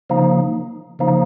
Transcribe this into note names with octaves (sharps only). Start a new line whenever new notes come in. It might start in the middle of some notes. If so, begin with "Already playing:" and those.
C#3 F3 A#3 D#4
C#3 F3 A#3 D#4